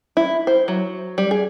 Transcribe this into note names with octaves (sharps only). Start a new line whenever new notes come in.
E4
C5
F#3
G3
G#4